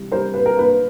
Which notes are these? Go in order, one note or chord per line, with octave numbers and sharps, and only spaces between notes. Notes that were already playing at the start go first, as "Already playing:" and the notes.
Already playing: C3 E3 G3
G3 A#4 C5
A#3 B4
A#4
A#3 B4